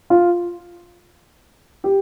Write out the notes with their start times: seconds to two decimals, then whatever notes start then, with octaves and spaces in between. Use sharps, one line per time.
0.10 F4
1.84 G4